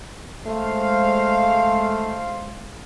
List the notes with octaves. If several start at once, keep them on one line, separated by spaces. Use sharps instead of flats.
G#3 A3 C5 F5